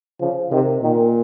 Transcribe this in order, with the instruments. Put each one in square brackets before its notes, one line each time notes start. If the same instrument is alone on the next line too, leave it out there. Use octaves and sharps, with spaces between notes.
[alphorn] C#3 [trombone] F3
[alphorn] C3 [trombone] D#3
[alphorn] A#2 [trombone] D#3